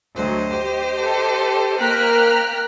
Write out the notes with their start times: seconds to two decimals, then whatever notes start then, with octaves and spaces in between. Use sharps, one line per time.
0.15 D2 F#3 C5 D#5
0.51 G4
1.01 A4
1.79 A#3 G5 A#5 F6 F#6 B6